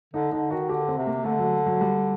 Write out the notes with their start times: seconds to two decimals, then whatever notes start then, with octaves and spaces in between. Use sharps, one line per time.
0.14 D3 D#4
0.32 D3 D#4
0.51 D#3 F#4
0.69 D3 G4
0.88 C4
0.97 C3
1.07 A#3
1.24 D3 A3
1.39 F#3
1.66 F#3
1.81 G3